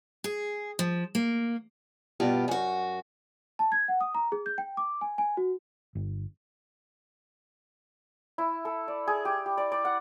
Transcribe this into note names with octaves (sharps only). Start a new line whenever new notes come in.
G#4
F3
A#3
G2 B2 F4 G4
F#2 F#4
A5
G#6
F#5
D#6
A#5
G#4
G6
G5
D6
G#5
G#5
F#4
G1
E4
A4
D5
G#4
G4
G4
D5
D5
F#5